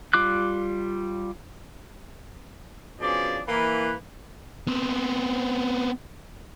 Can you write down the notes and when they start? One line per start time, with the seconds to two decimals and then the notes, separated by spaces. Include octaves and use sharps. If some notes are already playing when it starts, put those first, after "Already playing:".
0.13 G3 F4 D6 F#6
3.00 B2 F3 C#4 D4 G#4 D5
3.47 E3 A#3 B4
4.67 B3 C4